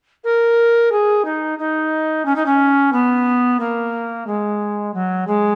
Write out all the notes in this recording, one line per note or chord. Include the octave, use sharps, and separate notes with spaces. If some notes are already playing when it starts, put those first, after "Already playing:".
A#4
G#4
D#4
D#4
C#4
D#4
C#4
B3
A#3
G#3
F#3
G#3